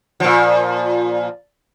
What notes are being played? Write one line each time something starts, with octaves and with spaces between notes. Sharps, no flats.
A#2 F3